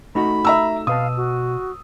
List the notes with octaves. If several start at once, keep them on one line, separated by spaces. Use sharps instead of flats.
A3 D#4 F#4 B5
E5 A#5 E6
B2 B4 F5 A5 D#6
F#4